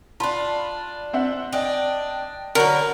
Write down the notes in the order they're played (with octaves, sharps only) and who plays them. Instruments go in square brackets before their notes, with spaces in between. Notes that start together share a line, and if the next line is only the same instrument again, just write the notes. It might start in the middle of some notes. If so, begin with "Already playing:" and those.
[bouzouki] D4 F4 [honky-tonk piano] A5 B5
[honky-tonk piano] C4 E5 F#5
[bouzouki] D4 [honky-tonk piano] D#5 G5
[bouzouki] D3 F#3 B4 [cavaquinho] A#4